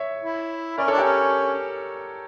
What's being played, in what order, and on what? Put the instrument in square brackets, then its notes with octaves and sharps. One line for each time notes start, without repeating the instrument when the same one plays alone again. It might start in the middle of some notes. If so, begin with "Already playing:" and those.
Already playing: [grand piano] C#5 E5
[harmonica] E4
[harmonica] C#4 [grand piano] A#4 D5
[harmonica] D4 [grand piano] A4 C#5
[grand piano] G4 A#4
[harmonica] C#4